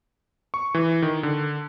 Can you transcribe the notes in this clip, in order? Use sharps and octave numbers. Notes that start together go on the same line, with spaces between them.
C#6
E3
D#3
D3